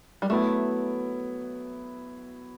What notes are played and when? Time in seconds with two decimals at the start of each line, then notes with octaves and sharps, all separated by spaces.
0.22 G3
0.29 F#3 A3 B3 E4